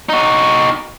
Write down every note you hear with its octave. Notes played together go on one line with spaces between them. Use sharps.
D#4 F#4